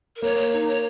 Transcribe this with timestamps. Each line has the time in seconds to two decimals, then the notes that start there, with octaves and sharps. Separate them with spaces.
0.16 A#4
0.22 A#3 C#5
0.38 C#5
0.53 D#4
0.68 C#5